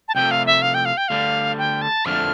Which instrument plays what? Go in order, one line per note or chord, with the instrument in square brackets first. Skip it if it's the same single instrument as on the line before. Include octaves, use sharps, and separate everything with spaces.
[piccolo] A5
[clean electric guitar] C2 C3 F3 A3 [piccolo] G5
[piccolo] F5
E5
F5
G5
F5
G5
[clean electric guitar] D2 D3 G3 [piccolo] F5
[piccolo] G5
A5
[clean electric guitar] F2 D3 F3 A3 D4 [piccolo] F6